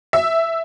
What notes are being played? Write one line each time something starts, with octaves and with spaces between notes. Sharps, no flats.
E5